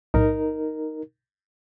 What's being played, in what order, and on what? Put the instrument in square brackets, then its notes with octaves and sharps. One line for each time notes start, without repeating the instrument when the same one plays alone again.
[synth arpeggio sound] B1 A2 [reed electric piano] D#4 A#4